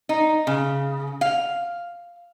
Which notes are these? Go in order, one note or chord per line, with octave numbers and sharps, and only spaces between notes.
D#4
C#3
F5